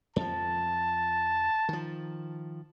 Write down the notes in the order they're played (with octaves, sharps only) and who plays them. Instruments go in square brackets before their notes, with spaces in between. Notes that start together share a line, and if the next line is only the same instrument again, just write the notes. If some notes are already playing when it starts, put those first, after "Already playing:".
[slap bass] F2 F3 [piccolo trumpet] A5
[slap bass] D#3 F3